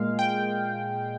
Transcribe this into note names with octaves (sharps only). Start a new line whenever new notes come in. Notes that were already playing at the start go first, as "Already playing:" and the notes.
Already playing: A#2 G#3 F5
G5